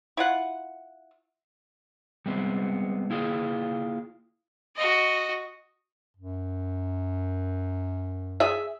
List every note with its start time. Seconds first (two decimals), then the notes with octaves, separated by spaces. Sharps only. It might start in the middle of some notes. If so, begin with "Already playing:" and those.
0.17 E4 F4 F#5
2.26 G3 G#3 B3 C4
3.10 A#3 E4 F4 G#4
4.76 F#4 D#5
6.17 F#2
8.40 G#4 E5